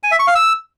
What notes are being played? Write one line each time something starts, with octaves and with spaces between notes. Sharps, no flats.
G#5
E5
C#6
F5
E6